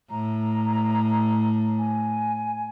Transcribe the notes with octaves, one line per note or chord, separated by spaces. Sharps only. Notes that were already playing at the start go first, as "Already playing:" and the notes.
A2 A#5
G#5